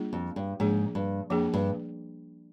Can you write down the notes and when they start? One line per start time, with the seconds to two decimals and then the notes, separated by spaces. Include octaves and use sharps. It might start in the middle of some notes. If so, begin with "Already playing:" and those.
Already playing: G3 A#3 D4 F4 G#4
0.13 F2
0.36 G2
0.60 G#2 F3 A#3 D4 G#4
0.95 G2
1.30 F2 F3 A#3 D4 G#4
1.54 G2